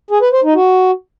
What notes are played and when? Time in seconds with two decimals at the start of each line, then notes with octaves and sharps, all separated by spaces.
0.11 G#4
0.22 B4
0.33 C5
0.44 D#4
0.55 F#4